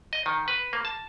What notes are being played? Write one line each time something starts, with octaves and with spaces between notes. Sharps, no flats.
D#5
D#3
B4
A#3
A5